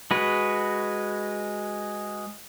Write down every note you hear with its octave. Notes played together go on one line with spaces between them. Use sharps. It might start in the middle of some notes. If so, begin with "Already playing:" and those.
G#3 F#4 B4